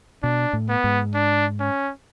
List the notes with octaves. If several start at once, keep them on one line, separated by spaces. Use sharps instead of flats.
B2 D4
A2
B3
G#2
D4
C#4